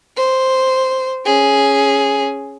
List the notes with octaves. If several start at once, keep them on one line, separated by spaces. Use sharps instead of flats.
C5
C#4 G#4